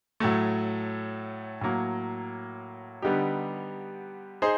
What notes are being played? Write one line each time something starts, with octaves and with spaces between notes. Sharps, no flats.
A2 F#3 A3
A2 F#3 A#3
D3 G3 B3 D#4 G4
D#4 G#4 C5